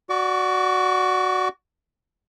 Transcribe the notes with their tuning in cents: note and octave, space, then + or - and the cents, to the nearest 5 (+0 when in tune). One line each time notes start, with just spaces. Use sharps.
F#4 +0 D5 +0 D6 -45